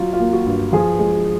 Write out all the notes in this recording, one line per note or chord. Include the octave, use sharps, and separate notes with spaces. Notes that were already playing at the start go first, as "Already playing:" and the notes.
Already playing: F#3 F4
F4
A#3
F#4
G2
F3 G#4
G#3